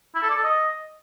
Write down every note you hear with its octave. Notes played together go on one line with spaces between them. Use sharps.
E4
A4
D5
A4
D#5